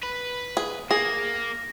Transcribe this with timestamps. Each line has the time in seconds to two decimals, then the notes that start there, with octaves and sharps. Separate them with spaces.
0.03 B4
0.57 G#4
0.91 A#3 G#4 A#6